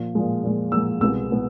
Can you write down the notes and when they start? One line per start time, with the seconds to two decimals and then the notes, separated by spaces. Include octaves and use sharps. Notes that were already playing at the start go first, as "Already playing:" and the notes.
Already playing: A#2 F3
0.15 A#2 F3 G#3
0.44 A#2 F3 G#3
0.72 A#2 F3 G#3 E6
1.00 C2 B2 G#3 B3 E6
1.30 B2 G#3 B3